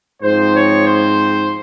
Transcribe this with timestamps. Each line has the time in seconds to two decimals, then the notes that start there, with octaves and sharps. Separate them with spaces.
0.21 G#2 F3 C4 C5
0.54 C#5
0.87 C5